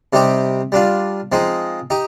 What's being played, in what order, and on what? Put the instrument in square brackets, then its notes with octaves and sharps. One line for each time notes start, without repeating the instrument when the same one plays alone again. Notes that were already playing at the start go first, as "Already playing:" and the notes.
[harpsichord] C3 G3 C4 D#4 G4
G3 D4 F4
F3 G#3 C4 D#4
D#4 G4